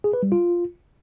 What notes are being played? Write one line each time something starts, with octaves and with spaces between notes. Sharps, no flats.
G#4
B4
G3
F4